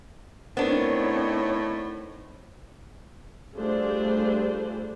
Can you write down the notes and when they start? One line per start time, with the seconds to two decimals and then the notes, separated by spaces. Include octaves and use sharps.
0.57 A2 B3 C4 D4 D#4 A#4 C5 C#5
3.56 G3 A3 D4 F4 G#4 C5